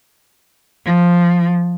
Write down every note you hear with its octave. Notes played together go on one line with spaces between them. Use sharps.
F3